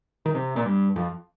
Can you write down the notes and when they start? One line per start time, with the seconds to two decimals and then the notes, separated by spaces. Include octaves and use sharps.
0.26 D#3
0.35 C3
0.56 A#2
0.66 G2
0.96 F2